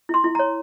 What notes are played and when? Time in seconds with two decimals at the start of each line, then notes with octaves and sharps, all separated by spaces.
0.09 E4 C6
0.24 E4
0.35 A#5
0.39 C#5